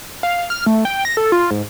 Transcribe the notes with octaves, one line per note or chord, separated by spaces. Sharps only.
F5
F6
A3
G5
A#6
A4
F4
G#2